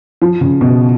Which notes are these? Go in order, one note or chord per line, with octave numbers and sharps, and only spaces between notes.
F3
C#3
B2